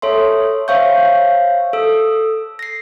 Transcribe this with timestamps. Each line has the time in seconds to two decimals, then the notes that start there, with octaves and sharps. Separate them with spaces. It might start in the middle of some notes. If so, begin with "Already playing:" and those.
0.02 A4 C#5 E5 C6
0.68 C5 C#5 E5 F5 C#6 G6
1.73 A4 E6
2.59 A#6 C7